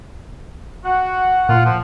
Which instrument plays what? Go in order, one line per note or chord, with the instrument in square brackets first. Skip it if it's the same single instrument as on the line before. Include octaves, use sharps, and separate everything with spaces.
[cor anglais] F#4 [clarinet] F#5
[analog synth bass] A#2 [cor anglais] F4
[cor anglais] F3